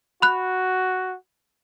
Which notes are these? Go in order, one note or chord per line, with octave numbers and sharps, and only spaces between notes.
F#4 B5 F#6